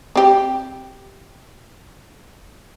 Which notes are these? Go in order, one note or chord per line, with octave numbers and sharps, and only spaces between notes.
C4 G4